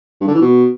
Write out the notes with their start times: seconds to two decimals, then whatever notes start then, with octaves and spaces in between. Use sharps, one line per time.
0.21 G2
0.28 D3
0.35 E3
0.42 B2